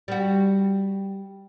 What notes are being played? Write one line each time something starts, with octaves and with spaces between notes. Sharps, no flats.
G3 F#4